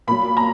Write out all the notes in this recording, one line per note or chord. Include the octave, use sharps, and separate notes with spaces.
A#2 F#3 B5
A#5